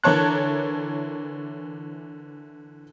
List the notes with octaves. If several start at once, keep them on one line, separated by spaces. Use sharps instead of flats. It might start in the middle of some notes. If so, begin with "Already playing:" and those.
D3 E3 A#4 C#5 A5 F#6